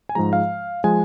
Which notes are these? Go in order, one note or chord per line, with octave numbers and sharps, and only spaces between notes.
G#5
G#2 F3 G#3 A#5
F5
F3 G#3 G#5